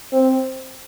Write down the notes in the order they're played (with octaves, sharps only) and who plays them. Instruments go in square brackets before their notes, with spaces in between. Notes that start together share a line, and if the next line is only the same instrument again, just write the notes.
[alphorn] C4